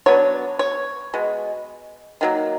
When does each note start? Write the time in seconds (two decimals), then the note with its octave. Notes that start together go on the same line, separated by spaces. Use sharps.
0.06 F#3 B3 D4 C#5
0.59 C#5
1.14 B2 G#3
2.21 D#3 F#3 A#3